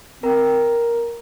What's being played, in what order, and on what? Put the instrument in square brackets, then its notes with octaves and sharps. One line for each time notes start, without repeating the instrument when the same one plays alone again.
[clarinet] C4 [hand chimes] A#4 A#5